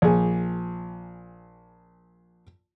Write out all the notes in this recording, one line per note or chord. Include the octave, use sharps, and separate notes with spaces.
A#1 G#4